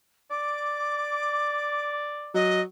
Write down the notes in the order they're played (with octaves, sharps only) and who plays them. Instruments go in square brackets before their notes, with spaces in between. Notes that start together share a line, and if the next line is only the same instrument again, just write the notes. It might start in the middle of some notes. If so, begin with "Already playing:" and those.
[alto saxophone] D5 [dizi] D6
[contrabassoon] F#3 [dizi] D#5